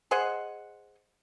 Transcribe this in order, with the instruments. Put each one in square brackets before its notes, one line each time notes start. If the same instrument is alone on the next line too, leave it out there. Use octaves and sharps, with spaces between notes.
[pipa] G#4 C5 D#5 F#5